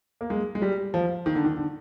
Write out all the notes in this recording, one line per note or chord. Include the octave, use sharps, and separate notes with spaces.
A#3
G#3
G#3
G3
F3
D#3
D3
D#3
D3